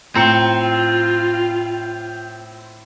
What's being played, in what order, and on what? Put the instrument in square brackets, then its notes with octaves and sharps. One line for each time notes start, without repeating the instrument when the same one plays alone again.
[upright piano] A2 A#5 C#7 [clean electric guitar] C4 [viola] F4